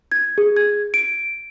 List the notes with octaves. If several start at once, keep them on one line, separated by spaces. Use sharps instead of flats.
G#6
G#4
G#6
D7